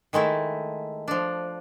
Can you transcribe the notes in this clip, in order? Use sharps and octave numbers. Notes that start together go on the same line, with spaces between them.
D#3 G#3 A3 E4
F3 D4